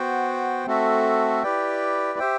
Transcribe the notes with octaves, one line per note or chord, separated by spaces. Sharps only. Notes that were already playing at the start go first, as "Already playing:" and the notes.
Already playing: B3 F#4 C5 G5
A3 C4 F#4 A4 E5
E4 G4 B4 D5 G5
G4 C5 E5 G5